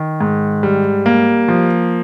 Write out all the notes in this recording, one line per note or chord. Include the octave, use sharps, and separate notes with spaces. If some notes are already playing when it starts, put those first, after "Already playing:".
Already playing: D#3
G#2
G3
A#3
F3